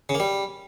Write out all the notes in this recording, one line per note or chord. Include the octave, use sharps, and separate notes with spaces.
C#3
A#3
G3